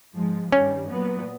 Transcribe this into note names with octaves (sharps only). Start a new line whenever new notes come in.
G#2 F3 G#3
G2 D#3 G3 C#4
A#2 F#3 B3